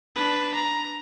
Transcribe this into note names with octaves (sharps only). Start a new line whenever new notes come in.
D4 B4
A#5